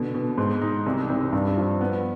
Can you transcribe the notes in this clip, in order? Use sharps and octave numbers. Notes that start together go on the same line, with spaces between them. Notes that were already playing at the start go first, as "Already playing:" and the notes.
Already playing: B2 D3
B2
G#2
D#4
C2
C2
G2
F3
B3